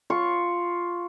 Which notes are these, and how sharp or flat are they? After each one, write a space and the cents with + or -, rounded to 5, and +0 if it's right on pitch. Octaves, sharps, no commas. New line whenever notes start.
F4 +0 C#6 +0